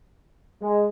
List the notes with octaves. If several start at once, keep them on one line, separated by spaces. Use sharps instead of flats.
G#3